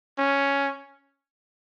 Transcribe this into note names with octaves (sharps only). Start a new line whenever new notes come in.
C#4